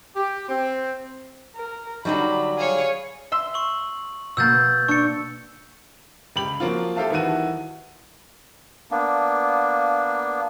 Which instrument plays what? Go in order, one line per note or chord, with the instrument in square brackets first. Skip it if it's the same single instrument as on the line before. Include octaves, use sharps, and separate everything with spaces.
[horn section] G4
C4
[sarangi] A#4
[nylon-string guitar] D3 F#3 [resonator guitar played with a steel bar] G3 D#4 [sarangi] B5
[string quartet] G#4 C#5 [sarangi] F5
[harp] E5 C6 E6
[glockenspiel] C#6 F#7
[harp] B2 A#3 [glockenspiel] E6 G6 A6
[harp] D4 [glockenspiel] C#6 C#7
[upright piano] C#2 G4 B5 F#7
F3 F#3 A#3 C4 F4
G4 A4 C5 E5 F5 A5
D#1 D#3 E3 E4 F#4 D#7
[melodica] A#3 B3 D4